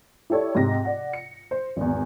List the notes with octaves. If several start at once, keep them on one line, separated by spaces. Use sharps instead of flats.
E4 G4 A4 C#5 D5
G#2 C3 G4 A#6
D5 F#5
C#7
C5
G#1 E2